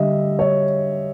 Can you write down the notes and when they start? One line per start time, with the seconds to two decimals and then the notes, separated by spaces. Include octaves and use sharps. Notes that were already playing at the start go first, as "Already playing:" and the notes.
Already playing: D3 G3 D#5 E5
0.39 C#5